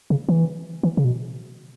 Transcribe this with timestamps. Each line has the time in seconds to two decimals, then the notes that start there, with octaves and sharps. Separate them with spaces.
0.10 C#3
0.29 E3
0.83 E3
0.97 C#3
1.05 B2